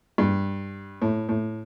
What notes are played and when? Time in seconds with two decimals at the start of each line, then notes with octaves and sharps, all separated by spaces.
0.18 G2
1.02 A2
1.29 A2